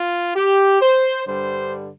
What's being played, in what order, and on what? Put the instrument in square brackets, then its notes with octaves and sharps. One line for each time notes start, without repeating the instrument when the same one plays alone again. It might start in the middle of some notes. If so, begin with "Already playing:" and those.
Already playing: [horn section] F4
G4
C5
G2 D3 G3 C5